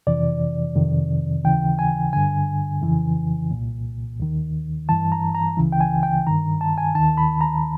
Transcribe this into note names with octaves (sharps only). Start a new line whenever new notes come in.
F2 C3 E3 D5
F2 C3 D#3
D#2 C#3 E3 G5
G#5
G2 D3 G#5
F2 C#3 E3
C2 A#2
D#2 D#3
G2 E3 A5
A#5
A#5
C#2 C#3 E3
G5
G#5
G5
G2 D#3 A#5
A5
G#5
D#2 D#3 A5
B5
A#5